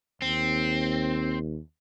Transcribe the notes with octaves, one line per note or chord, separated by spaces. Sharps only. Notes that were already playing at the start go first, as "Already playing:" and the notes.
D#2 C4